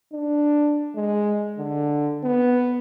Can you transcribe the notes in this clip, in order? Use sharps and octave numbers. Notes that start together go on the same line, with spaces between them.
D4
G#3
D3
B3